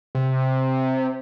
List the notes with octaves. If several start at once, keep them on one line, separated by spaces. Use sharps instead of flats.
C3